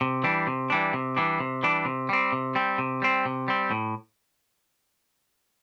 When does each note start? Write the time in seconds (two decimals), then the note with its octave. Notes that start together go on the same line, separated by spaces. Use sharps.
0.01 C3
0.24 E3 G3 D4
0.47 C3
0.70 E3 G3 D4
0.93 C3
1.16 E3 G3 D4
1.40 C3
1.63 E3 G3 D4
1.85 C3
2.09 G3 C4
2.33 C3
2.55 G3 C4
2.78 C3
3.02 G3 C4
3.25 C3
3.48 G3 C4
3.71 A2